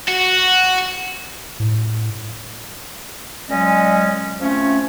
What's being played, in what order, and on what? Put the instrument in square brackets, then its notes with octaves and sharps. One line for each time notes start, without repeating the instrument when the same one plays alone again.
[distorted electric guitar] F#4
[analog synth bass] A2
[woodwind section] A#2 F#3 G#3 C#4 D#5 G#5
F3 A3 C4 C#4